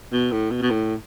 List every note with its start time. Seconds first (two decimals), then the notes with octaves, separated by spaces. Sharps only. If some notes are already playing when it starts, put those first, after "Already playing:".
0.12 B2
0.32 A2
0.51 B2
0.62 B2
0.70 A2